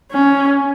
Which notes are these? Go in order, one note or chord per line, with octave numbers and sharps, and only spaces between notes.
C#4